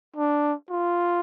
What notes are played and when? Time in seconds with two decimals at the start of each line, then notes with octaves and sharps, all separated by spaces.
0.16 D4
0.70 F4